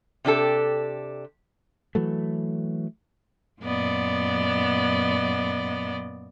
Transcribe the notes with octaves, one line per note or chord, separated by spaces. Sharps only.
C3 D4 G4 A4
E3 F#3 A3
F#2 A#2 B3 D5 D#5